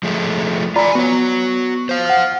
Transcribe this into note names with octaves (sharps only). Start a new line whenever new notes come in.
F3 G#3 A3
F4 D5 G#5 A#5 B5
B3 F#4 C#5
C5 F5
F#5 F6